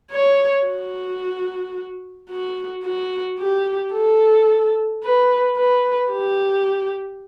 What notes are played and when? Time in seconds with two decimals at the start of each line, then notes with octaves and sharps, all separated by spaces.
0.11 C#5
0.65 F#4
2.30 F#4
2.84 F#4
3.39 G4
3.93 A4
5.03 B4
5.57 B4
6.12 G4